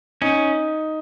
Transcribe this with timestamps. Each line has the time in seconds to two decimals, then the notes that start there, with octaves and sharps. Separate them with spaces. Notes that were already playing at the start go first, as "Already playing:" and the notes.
0.22 C#4 D#4